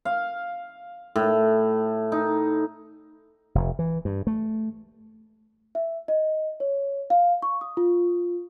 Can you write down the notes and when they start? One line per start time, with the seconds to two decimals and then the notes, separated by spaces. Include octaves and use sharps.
0.05 F5
1.16 A2
2.12 D#4
3.55 F1
3.79 E3
4.05 G2
4.27 A3
5.75 E5
6.08 D#5
6.60 C#5
7.10 F5
7.42 C#6
7.61 D#6
7.77 F4